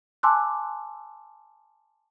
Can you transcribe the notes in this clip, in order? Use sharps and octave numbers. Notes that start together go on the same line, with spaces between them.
G#5 A5 C6 D6 E6 F#6